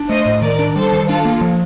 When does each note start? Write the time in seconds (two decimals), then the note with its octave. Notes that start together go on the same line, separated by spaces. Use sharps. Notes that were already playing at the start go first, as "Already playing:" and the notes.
Already playing: D4
0.09 A3 C5 D#5
0.26 A2
0.42 D#3 A#4 D5
0.59 D4
0.76 G3 A4 C5
0.92 D#3
1.09 D4 F4 A4
1.25 A#3
1.41 F3